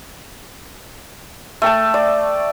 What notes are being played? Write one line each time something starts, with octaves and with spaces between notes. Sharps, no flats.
A3 G5 A5
D5